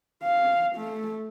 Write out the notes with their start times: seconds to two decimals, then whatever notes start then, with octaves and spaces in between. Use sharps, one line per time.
0.23 F5
0.76 A3